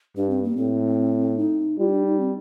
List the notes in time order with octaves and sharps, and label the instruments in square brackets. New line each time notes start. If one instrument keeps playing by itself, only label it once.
[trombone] G2 [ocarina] D4
[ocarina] C4
A#3
[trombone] A2 [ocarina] C4
[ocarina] D#4
[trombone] G3 [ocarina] F4
[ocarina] D#4
D4
D#4
C4